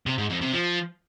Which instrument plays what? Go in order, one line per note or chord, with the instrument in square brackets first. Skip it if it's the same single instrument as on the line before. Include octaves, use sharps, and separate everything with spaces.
[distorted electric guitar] C3
G#2
F2
C3
F3